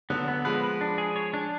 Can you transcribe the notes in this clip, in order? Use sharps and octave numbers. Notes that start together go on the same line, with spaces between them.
D3 F#3 B3
B3
F3 G#3 B4
B4
D4
G#4
C#5
D4